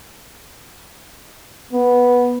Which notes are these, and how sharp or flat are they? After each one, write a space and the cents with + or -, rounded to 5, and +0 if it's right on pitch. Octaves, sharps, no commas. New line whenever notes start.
B3 -10